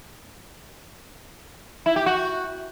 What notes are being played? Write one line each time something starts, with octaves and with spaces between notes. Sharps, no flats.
E4
G4
F#4